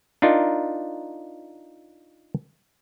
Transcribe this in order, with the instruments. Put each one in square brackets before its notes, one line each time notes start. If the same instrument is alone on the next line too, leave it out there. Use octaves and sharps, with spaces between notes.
[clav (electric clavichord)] D4 D#4 F4 A#4